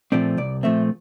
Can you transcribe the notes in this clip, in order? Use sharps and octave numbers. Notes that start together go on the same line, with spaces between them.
A#2 F3 A3 C4 D5
C2 D5
A#2 F3 A3 C4 E5